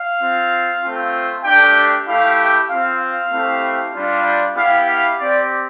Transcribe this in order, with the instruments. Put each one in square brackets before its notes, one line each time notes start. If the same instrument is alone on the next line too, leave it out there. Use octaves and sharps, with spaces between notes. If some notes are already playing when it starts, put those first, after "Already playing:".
Already playing: [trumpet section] F5
C4 F4
A3 C4 F4
A3 D4 G4 G5
A3 E4 G4 F5
G5
C4 F4 F5
F5
A3 C4 E4 G4
G3 D4 F4
B3 E4 G4 F5
F5
C4 G4 D5